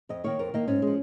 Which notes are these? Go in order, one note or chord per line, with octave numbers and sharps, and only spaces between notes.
F2 D#5
D#3 A#3 C#5
F2 A#4
D#3 A#3 D#5
G#2 C#4
F3 G#3